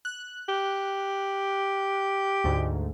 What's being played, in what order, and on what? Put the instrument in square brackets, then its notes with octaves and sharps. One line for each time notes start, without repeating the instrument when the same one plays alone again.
[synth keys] F#6
[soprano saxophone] G4
[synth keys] D2 G#2